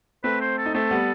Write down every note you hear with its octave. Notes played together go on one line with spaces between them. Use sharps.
A3 C4 B4
C5
A4
D#4
A3 C4 A4
G3 B3